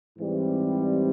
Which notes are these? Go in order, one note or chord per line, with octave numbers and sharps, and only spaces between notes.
G#2 E3 G3 C4